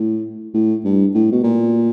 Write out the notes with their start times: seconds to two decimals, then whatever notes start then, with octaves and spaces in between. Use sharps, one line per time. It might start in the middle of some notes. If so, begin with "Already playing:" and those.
Already playing: A2
0.54 A2
0.85 G2
1.14 A2
1.32 B2
1.44 A#2